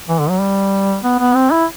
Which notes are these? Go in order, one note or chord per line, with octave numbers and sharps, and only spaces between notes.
E3
D3
F#3
G3
B3
B3
C4
E4